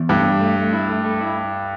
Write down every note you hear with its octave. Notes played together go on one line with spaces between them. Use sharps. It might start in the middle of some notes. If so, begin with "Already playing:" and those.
Already playing: E2
G2 A3
G4
A3
A3
E4
A3
A3
E4